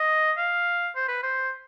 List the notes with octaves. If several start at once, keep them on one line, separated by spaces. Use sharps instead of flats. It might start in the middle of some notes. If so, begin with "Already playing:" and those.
Already playing: D#5
F5
C5
B4
C5